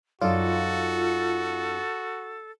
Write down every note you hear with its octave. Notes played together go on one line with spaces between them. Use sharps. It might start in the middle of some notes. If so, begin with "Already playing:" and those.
F#2 D#4 F4 F#4 A4 D5